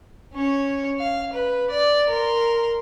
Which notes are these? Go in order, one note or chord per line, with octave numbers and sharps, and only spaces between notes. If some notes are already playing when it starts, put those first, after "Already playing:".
C#4 C#5
F5
B4
D5
A#4 C6